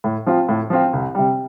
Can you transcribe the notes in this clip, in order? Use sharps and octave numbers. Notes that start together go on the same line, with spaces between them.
A2
F3 C4 F4
A2
F3 C4 F4
C2
C3 G3